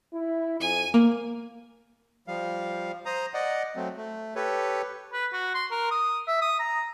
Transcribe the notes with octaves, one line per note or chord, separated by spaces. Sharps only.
E4
F2 G#5
A#3
F3 G3 F5
C5 A#5 D#6
D5 D#5 F#5
F#3 A3 C4
A3
G4 A4 B4 C#5
B4
F#4
C6
A#4
D#6
E5
D#6
A#5